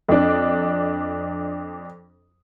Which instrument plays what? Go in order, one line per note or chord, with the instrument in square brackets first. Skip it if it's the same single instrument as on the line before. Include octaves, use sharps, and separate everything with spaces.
[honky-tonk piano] F2 D4